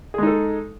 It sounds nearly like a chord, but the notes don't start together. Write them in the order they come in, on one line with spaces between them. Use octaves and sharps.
G#4 G#3 D#4 A4